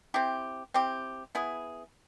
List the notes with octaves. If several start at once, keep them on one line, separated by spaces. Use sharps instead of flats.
C4 E4 G4
C4 E4 G4
B3 E4 G#4